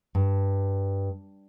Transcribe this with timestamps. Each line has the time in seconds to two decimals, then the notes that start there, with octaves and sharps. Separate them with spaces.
0.15 G2